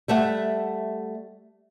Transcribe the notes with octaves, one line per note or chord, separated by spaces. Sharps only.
G3 A3 E5 F#5